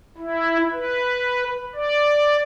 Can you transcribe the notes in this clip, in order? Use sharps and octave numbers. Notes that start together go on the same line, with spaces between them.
E4
B4
D5